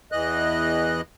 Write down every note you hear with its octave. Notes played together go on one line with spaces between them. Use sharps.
E2 E3 D#5 F#6